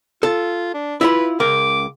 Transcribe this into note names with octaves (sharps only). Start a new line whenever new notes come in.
F4 A4
D4
E4 F4 B4 B5
C#2 A#4 D6